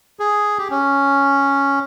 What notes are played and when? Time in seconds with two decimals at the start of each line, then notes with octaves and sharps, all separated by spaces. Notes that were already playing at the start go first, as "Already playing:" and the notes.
0.20 G#4
0.58 G4
0.71 C#4